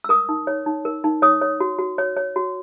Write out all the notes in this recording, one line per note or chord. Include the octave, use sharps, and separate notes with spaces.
E6
A#4 D#6
D#4
C#5
D#4
A#4
D#4
C#5 D#6
C#5
F#4
F#4
C#5
C#5
F#4